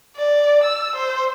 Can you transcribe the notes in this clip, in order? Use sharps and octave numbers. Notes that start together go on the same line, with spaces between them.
D5
E6
C5